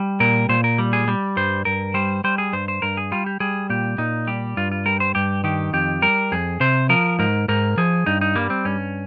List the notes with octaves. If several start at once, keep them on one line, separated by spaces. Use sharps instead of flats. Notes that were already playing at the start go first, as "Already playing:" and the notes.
Already playing: G3
A#2 A#4
A#2 C5
A#4
G3
G#4
G3
G2 C5
G2 A#4
G3 C5
G3 C5
G#4
G2 C5
C5
G2 A#4
G#4
G3 F4
G4
G3 G#4
A#2 G4
A#2 D#4
G3 G4
G2 F4
F4
G3 A#4
C5
G2 G4
D#3 G4
F2 G4
G3 A#4
F2 G#4
C3 C5
F3 A#4
G#2 A#4
G#2 A#4
F3 G#4
G2 D#4
D#4
G3 A#3
C4
G2 C#4